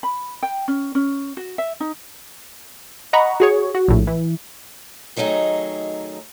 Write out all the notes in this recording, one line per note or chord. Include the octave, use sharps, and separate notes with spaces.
B5
G5
C#4
C#4
F#4
E5
D#4
D#5 F#5 A#5 B5 C#6
F#4 G#4 C#5 C#6
F#4
A#1 A2
E3
D#3 F#3 A3 D#4 G#4